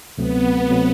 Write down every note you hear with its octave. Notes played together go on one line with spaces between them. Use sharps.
D2 C3 F#3 A3 B3 C4
C3 F#3 A3 C4